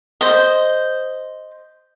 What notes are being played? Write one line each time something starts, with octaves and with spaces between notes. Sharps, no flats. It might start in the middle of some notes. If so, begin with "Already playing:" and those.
C5 D#5